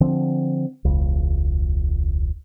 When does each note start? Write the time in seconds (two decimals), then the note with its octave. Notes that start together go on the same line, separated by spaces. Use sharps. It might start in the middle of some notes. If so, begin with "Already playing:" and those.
0.01 D3 F3 C4
0.85 E1 C#2